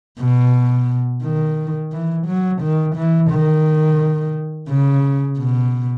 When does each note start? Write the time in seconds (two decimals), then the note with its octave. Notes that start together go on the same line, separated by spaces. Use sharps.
0.19 B2
1.23 D#3
1.92 E3
2.27 F#3
2.62 D#3
2.96 E3
3.31 D#3
4.69 C#3
5.38 B2